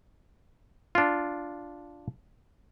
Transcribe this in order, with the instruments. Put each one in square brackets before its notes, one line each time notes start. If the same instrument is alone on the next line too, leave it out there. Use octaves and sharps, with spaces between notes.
[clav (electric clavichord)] D4 F4